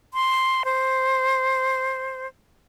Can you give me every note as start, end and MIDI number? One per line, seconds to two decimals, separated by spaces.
0.14 0.63 84
0.65 2.27 72